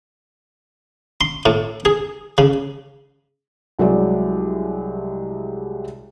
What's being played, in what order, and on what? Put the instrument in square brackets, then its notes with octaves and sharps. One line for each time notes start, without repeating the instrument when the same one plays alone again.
[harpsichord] C6
A2
G#4
C#3
[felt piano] C2 F#3 G#3 G4 D5